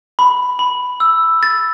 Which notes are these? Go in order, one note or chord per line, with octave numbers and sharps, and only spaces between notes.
B5
B5
E6
A6